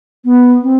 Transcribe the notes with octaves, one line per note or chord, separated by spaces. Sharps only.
B3
C4